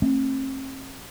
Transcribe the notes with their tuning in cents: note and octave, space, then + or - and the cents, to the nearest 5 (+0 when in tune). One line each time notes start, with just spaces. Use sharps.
A3 +25 C4 +45